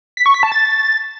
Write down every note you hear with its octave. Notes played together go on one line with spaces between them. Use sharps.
B6
C#6
B6
A5
A6